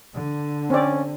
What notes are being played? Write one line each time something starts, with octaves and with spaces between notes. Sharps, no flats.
D3
C4 C#4 D5